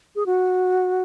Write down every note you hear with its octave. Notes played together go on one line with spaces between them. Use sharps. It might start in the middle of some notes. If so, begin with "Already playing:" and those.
G#4
F#4